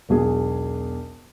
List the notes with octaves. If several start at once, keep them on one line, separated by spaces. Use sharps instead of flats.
E1 B1 G#4